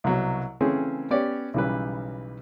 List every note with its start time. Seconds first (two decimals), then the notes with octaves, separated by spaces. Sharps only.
0.04 C2 B2 F#3
0.61 C#3 E3 A3 C4 C#4 G#4
1.11 B3 C#4 G4 C#5 D5
1.54 B1 C#3 E3 G3 B4